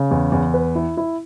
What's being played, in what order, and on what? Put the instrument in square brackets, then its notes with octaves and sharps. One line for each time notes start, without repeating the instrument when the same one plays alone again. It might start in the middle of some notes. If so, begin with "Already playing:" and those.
Already playing: [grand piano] C#3
E2
E2
B4
E4
E4